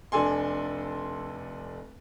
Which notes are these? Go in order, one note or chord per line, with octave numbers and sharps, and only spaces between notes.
F1 D4 A4 G#5 C6